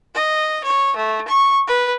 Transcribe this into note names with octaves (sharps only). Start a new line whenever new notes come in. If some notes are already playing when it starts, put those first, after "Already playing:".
D#5
C#5
A3
C#6
B4